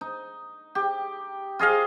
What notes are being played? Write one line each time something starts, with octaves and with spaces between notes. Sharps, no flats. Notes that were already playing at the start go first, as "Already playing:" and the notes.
D#4
G4
F4 G#4 D#5 F5